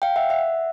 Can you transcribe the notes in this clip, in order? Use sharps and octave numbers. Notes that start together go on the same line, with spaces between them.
F5 G5
E5 F#5
E5 F#5